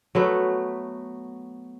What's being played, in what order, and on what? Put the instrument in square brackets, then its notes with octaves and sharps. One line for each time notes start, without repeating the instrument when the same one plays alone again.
[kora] F#3 A3 B3